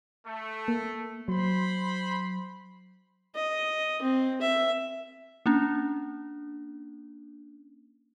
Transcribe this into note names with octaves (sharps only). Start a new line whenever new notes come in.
A3
A#3
F#3 C5 B5 C6
D#5
C4
E5
A#3 C#4 D4